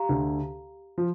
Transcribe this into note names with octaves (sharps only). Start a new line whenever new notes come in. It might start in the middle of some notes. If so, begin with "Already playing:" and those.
Already playing: G4 F5 A#5
D2 D3
F3